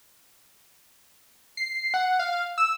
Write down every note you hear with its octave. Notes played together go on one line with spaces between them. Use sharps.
C7
F#5
F5
E6